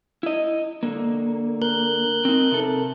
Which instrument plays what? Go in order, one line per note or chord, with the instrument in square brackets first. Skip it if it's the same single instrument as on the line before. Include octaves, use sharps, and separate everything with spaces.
[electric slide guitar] E4 D#5
D3 A#3
[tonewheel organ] A#4 F#6 G6
[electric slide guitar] C4 D#4
C3 A4